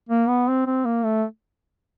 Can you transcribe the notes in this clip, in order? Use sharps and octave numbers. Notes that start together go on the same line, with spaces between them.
A#3
B3
C4
C4
A#3
A3